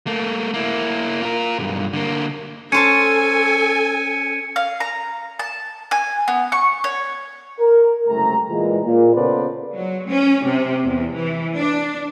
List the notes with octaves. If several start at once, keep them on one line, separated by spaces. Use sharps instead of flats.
A3 A#3
A#3 E4
F4 A#4
B1 G2
D3 A#3
C#4 A4 C5 G#5 A5 G#6 C#7 D#7
F5
A#5
A5
G#5
B3
C#6
C#5
A#4
F#1 C2 C3 A3 G4 A#5
A#2 E3 G#3
A#2
C#3 B3 A4 B4 C5 D5
F#3
C#4
C3
E2
E3
D4